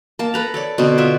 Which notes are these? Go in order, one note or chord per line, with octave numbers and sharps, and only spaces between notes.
A#3 A5
A4 B4 A#5
A4 C#5 D5
B2 D3 C4
F4 B4 E5